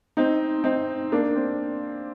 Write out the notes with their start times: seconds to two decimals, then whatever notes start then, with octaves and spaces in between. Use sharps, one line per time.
0.17 C4 D#4
0.64 C4 D#4
1.12 A#3 D4
1.35 C4